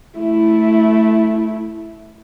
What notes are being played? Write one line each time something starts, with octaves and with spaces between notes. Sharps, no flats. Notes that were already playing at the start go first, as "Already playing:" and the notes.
A3 E4